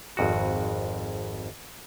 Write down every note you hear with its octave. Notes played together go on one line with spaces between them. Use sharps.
G#1 F2 F#4